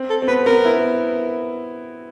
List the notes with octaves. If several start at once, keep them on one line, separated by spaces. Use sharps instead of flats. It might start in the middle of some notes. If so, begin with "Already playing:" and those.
Already playing: C4
A4
C4
B3 B4
B3 A#4
E4